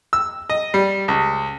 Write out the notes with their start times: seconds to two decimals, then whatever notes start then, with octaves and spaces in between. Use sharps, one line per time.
0.13 E6
0.50 D#5
0.74 G3
1.08 C#2